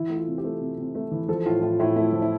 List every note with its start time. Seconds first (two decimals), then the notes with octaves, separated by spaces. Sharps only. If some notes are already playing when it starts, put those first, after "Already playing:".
Already playing: E3 E4
0.10 A3
0.16 F4
0.27 C3
0.38 G4
0.44 A3
0.61 C3
0.78 C3
0.95 A3
1.12 E3
1.29 F3 A4
1.45 A2 F4
1.62 A2 F4
1.79 A2 E4
1.96 A3 E4
2.13 F3
2.22 E4